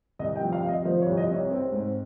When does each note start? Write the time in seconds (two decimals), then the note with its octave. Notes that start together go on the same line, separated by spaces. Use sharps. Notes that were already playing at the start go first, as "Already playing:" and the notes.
0.19 C2 D#5
0.36 G5
0.41 F3
0.52 F5
0.62 C3
0.68 D#5
0.85 F3 C5
1.02 C#5
1.06 C2
1.17 D#5
1.29 C3
1.34 C#5
1.51 C4
1.72 G#2